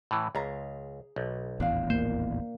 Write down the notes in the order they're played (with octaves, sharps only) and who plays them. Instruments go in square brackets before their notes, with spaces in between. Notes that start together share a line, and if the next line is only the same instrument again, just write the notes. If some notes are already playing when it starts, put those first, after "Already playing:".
[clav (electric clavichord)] A2 E3
[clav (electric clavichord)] C#2 [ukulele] G#4 A#5
[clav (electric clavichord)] B1
[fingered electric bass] D#1 A1 E2 [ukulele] D4 F5
[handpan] A#3 [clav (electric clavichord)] C5